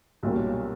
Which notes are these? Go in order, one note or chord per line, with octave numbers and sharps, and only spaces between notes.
B1 A#2 G3 C#4